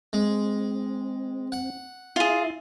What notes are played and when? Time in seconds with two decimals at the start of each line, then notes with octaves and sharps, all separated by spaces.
0.13 G#3 C4
1.52 F#5
2.16 E4 F4 G#4 E5 A6